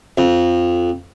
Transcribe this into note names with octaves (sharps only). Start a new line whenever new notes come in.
F2